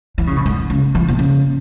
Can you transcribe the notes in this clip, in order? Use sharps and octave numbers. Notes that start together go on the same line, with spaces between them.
E3
C#3
B2
G#2
C#3
E3
B2
C#3